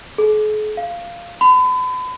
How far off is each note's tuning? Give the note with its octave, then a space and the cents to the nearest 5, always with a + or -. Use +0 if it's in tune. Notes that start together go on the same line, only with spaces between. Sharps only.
G#4 +45
F5 -10
B5 +40